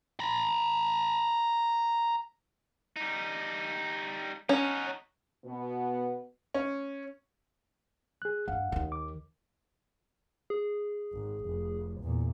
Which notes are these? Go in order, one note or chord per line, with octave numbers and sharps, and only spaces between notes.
A#5 B5
G3 D#4
C#4 D#4 F#4
B2 B3
C#4
G#4 F#6
G2 F5 F#5
D#2 D#3
D6
G#4
G#1
F1
E2 A#2